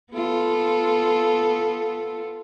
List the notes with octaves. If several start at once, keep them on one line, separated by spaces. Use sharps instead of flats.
B3 F4 A4